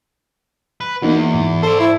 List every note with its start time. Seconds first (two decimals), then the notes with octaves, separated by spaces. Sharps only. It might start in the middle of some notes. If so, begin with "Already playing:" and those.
0.81 B4
1.02 E2 A#3 D#4 F#4
1.35 G#2
1.63 A4 C5 D5
1.80 E4